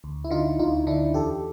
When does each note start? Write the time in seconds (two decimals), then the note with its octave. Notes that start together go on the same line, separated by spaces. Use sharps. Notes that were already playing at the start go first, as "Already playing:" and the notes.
0.04 D2
0.24 E4
0.31 D3 D#4 F4
0.59 D2 D#4 F4
0.87 D3 D4 E4
1.14 E2 G4 A4